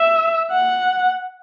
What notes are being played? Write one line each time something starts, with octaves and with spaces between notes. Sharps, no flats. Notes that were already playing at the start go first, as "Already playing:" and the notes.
Already playing: E5
F#5